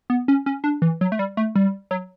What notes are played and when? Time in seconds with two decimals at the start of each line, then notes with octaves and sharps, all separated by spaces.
0.10 B3
0.28 C#4
0.46 C#4
0.64 D4
0.82 E3
1.01 F#3
1.12 A3
1.19 G3
1.37 A3
1.55 G3
1.91 F#3